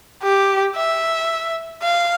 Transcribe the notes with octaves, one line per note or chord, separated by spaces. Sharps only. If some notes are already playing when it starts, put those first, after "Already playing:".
G4
E5
F5